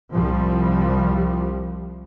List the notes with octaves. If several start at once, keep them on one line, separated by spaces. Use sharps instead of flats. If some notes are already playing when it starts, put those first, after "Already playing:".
C2 F3 G3